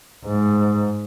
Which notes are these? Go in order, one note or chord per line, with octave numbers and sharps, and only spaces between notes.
G#2